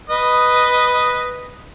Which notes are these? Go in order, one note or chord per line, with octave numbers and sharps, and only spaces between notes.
B4 D#5